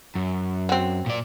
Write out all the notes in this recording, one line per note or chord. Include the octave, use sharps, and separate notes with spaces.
F#2
F#3 C4
A#2 D5